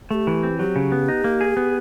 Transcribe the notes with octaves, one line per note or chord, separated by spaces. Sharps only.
A3 G4 G#4
E3
C4
F#3 G4
C#3
B3
D#4
A#3
G#4
B3